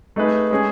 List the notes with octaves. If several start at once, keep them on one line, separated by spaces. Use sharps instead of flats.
A3 D#4 G#4 B4
G#3 C#4 G#4